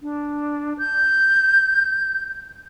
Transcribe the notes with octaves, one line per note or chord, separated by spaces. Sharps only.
D4
G6